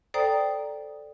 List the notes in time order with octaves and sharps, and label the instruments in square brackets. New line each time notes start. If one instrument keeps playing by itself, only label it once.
[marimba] A4 C5 D5 G5 A#5 D#6